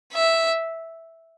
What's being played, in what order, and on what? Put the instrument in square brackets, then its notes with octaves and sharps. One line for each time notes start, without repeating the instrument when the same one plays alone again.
[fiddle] E5